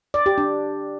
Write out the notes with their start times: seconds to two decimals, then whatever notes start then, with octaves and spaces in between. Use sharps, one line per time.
0.14 D5
0.26 G4
0.38 D4